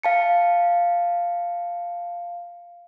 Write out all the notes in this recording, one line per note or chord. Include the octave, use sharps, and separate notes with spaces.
F5 A5 C#7